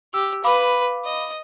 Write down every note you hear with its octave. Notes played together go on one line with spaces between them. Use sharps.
G4 E6
B4 F5 B5 D6
D#5